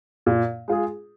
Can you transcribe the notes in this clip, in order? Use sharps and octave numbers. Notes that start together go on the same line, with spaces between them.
A#2
G#3 F4 G#4